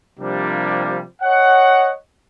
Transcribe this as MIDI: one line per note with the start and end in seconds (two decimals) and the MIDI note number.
0.20 1.01 48
0.20 1.01 53
0.20 1.01 55
0.20 1.01 58
0.20 1.01 62
1.22 1.91 73
1.22 1.91 75
1.22 1.91 78